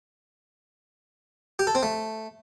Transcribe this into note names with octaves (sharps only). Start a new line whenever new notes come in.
G4
A4
C4
A3